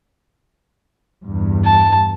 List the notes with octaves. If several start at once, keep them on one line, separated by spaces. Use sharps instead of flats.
E2 G2
A5